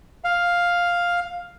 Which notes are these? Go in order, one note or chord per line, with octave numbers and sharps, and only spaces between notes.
F5